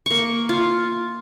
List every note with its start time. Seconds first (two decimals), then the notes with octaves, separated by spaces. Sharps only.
0.06 A#3 C#6
0.49 F4